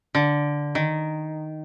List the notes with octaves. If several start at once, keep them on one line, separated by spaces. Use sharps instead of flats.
D3
D#3